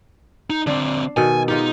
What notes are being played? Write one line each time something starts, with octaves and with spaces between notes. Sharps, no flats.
D#4
D3 C4 D4
B2 D#3 A4 G#5
G#3 D#4 F4 G4